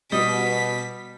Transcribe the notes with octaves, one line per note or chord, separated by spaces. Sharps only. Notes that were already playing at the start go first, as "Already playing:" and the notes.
B2 G3 D#5 B6